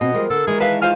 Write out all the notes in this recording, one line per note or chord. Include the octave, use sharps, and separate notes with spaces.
B2 C4 D#5
F3 G3 G#3 A#4
D3 A4
D#3 E3 G#3 G#4
B4 E5 F5 A5
F4 C5 F5 G#5 F6